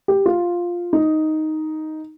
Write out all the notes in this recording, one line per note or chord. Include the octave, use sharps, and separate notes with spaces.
G4
F4
D#4